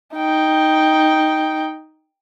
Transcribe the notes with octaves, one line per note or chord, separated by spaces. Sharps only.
D#4 G5